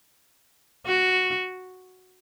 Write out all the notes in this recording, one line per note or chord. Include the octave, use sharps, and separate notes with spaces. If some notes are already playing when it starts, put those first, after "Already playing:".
F#4